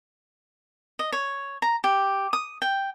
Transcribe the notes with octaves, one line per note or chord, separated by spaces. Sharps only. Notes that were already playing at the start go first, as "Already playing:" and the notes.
D#5
C#5
A#5
G4
D#6
G5